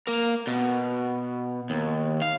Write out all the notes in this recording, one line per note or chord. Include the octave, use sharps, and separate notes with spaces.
A#3 A#4
B2
D#2
F5